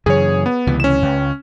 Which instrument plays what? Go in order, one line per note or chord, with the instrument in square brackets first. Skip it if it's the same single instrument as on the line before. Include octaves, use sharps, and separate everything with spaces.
[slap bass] F#2 C#3 E3 [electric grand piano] G#4 C#5
[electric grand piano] B3
[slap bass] C#2 C3 E3
[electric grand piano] C#4 E7
[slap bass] C#2